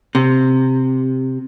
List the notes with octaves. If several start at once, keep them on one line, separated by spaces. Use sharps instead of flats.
C3